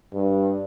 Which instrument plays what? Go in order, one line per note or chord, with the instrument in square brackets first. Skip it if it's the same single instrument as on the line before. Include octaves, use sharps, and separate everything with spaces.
[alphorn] G2